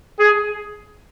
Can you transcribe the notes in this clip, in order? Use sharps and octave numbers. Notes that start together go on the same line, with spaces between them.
G#4